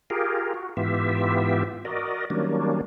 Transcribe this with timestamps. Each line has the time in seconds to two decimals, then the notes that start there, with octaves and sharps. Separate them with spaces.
0.10 F4 G4 G#4 A#4
0.54 F#4
0.77 G#2 E3 B3 F4 G4 E5
1.85 F#4 A#4 D5 D#5
2.30 D#3 F#3 G3 A#3 C#4 D4